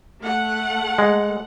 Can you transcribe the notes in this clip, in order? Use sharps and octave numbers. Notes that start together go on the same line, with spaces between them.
A3 F#5
G#3